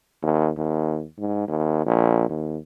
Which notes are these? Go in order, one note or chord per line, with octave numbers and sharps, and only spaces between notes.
D#2
D#2
G#2
D#2
A#1
D#2